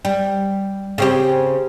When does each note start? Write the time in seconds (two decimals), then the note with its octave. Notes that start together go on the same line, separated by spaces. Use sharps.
0.05 G3
0.98 C#3 C4 G4